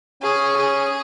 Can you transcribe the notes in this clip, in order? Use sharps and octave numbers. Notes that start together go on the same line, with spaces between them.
C#4 G#4
G#4